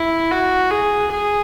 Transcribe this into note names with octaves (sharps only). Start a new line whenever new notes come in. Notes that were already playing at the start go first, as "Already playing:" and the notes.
Already playing: E4
F#4
G#4
G#4